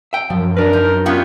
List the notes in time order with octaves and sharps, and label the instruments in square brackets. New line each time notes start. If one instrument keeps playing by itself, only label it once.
[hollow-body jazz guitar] E5 G5
[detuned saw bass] F#2 [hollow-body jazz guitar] F3
[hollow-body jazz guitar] D4 B4 [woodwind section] A#4
[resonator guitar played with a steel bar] D#4
[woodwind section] B3 [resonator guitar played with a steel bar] C#4 F4 G4